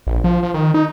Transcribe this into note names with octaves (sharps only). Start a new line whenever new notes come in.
A#1
F3
F3
D#3
D#4